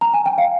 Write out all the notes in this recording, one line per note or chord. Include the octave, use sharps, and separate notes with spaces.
A#5
G#5
G5
F5